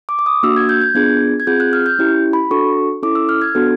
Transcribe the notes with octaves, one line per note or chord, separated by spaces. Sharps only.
D6
D6
D#6
A#3 D4 F#4 E6
G#6
G6
G6
B3 D4 F4 G#4 G#6
G#6
C4 F4 G#4 G6
F#6
F6
G6
C#4 E4 G4
B5
D4 F#4 A4 C#6
C#4 E4 A4 D6
E6
F6
G#6
B3 D4 F#4 A4